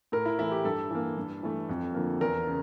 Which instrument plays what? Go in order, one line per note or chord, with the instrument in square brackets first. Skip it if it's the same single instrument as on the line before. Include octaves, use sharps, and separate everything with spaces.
[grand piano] A2 A#4
E4
E3 A3 E4
G4
G2 A4
E3 A#3
G2
E3 A3
F2
D3 F3 A#3
E2 A#4
C#3